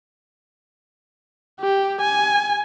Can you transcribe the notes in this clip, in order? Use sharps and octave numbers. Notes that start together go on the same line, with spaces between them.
G4
G#5